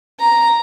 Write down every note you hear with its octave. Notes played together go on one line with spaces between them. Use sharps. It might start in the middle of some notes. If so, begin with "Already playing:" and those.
A#5